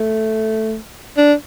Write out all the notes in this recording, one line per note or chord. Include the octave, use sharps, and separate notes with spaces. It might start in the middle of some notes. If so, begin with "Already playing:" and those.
Already playing: A3
D4